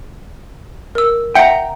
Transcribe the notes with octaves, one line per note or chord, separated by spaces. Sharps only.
A#4 E6
E5 F#5 G5 A#5 C#7